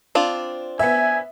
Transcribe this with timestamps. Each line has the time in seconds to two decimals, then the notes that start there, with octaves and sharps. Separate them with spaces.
0.15 C4 D4 F4
0.79 B3 E5 G#5